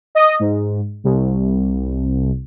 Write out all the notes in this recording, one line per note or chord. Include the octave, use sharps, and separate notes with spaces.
D#5
G#2
C2